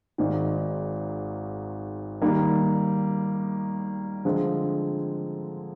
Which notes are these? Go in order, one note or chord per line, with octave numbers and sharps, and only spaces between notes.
G#1 G#2 D#3
D#3 G3 A#3
D3 F3 G#3 C4